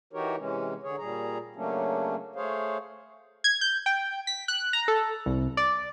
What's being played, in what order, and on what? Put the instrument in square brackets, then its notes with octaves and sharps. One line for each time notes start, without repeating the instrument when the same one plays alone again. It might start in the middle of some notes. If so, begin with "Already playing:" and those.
[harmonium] E3 D#4 F#4 G4 A#4 C#5
C3 E3 G#3 C#4
D3 G#4 C#5
A#2 G3 G#4 A#5
C#3 F#3 A3 A#3 C#4 D4
A3 G#4 C5 C#5 F5
[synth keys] G#6
G6
G5
B6
F#6
A#5
A4
C2
D5